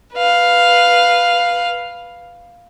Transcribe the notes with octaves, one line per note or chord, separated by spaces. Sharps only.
B4 F5